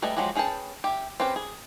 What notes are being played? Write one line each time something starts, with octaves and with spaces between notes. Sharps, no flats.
G3 A3 G#4 B4 D#5
F3 F#3 G#3 F#4 G4
C#4 G#4 B4 G5 A5
G4 E5
C4 C#4 G4 B4
G#4